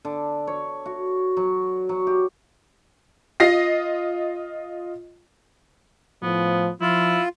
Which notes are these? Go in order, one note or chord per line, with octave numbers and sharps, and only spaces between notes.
D3
C#5
F#4
F#3
F#3
G4
F4 D#5 A#6 C7
A2 F3 B3
F3 E4 F4